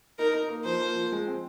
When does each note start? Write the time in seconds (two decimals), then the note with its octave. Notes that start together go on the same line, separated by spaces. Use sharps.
0.19 D#4 A#4
0.34 D#4
0.49 A#3
0.65 F3 C5
0.80 A#3
0.95 F3
1.12 G#3
1.27 C4